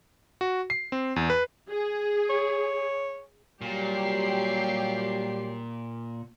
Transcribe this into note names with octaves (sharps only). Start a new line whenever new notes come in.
F#4
C7
C4
E2
B4
G#4
C#5
A#2 F#3 G3 G4 C7